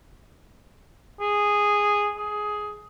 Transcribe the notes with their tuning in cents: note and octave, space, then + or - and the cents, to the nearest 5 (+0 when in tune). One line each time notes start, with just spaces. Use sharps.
G#4 -5
G#4 +10